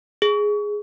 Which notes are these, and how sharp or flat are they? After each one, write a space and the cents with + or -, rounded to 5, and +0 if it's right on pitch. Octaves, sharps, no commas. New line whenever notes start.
G#4 +0